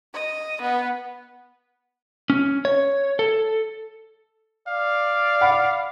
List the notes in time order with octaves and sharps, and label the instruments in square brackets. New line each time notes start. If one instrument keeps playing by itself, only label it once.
[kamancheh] D#5
B3
[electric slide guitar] C#4
C#5
A4
[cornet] D5 [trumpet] F5
[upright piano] F#5 B5